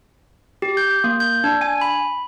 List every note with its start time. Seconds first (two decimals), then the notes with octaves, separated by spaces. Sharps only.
0.62 G4
0.77 G6
1.04 A#3
1.20 G6
1.44 D4
1.61 G#5
1.81 B5